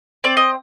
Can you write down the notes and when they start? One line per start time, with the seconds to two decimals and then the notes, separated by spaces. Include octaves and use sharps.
0.24 C4 D5
0.37 D#5